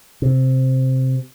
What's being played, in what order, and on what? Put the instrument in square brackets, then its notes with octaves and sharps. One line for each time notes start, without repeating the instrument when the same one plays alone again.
[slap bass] C3